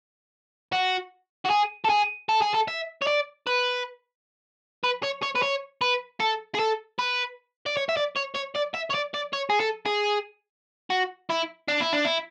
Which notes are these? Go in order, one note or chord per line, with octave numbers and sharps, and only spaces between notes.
F#4
F#4
G#4
A4
G#4
A4
G#4
A4
E5
C#5
D5
B4
B4
C#5
C#5
B4
C#5
B4
A4
G#4
A4
B4
D5
C#5
E5
D5
C#5
C#5
D5
E5
C#5
D5
D5
C#5
G#4
A4
G#4
F#4
E4
D4
E4
D4
E4